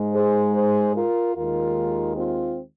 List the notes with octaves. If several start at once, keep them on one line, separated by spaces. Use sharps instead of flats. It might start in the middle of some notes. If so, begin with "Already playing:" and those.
Already playing: G#2 G#3
G#4 C5
G#4 C5
F4 A#4
D#2 D#3 G#3 F4 A#4
C4 F4